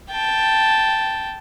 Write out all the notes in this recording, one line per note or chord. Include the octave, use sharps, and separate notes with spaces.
G5 A5